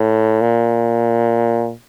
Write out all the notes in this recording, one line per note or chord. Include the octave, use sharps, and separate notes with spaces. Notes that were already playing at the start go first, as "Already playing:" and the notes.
Already playing: A2
A#2